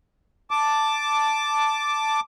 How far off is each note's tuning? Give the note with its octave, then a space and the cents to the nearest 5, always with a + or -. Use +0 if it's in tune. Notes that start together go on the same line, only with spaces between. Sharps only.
A5 +0 D6 +0